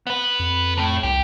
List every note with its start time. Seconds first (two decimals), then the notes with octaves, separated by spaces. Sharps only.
0.07 B3 B4
0.39 F2
0.78 A2 A3
1.03 C2 G4